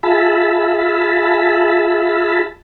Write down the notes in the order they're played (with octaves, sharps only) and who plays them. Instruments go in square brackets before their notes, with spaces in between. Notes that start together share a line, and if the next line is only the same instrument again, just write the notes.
[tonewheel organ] F4 G#4 E5 A5 B5